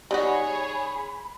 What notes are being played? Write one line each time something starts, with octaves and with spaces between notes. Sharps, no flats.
G3 D#4 F#4 G#4 C#5 B5